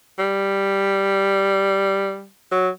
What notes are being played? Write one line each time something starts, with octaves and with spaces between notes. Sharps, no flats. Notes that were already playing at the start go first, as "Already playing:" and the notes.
G3
F#3